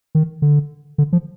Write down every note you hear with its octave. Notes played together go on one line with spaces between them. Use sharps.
D#3
D3
D3
F3